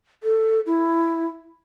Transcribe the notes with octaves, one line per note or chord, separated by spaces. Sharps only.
A4
E4